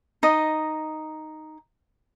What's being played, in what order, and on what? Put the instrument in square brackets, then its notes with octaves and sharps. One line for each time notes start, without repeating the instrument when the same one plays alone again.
[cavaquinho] D#4 D#5